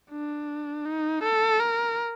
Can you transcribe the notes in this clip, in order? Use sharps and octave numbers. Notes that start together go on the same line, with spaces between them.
D4
D#4
A4
A#4